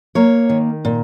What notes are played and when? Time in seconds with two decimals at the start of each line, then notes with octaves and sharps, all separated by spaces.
0.15 A#3 C#5
0.49 D#3
0.85 A#2